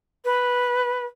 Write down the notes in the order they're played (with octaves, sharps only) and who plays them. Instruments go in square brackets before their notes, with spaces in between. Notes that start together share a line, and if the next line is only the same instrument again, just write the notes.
[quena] B4